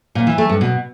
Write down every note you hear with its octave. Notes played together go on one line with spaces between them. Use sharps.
A#2
E3
A3
G2
B2